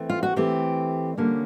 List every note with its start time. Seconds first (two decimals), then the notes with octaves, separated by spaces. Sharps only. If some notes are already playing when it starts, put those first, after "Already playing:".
Already playing: E3 A3 C4
0.10 F4
0.23 F#4
0.36 E3 A3 C4 G4
1.18 D3 G3 A#3 C#4